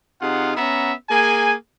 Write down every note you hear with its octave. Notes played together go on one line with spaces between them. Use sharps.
C3 D#4 F4 G#4 F#5
B3 C#4 E5 F#5 A#5
A#3 G#4 G#5